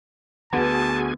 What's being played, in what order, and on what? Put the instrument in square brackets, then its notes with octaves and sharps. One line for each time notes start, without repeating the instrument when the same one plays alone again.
[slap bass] D2 D3 [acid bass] B3 [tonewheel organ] F#4 G#4 G#5 [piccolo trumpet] A5